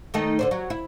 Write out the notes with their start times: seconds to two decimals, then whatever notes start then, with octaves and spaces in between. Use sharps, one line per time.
0.14 D#3 A3 D#4
0.39 D3 D4 C5
0.51 F#3
0.70 E4